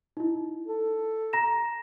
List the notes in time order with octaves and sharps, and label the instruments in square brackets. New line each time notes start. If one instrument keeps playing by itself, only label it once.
[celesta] D#4 E4
[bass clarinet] A4
[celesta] A#5 A#6 E7